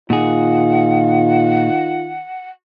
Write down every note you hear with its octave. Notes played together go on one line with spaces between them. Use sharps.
A#2 D#3 F4 G#4 F#5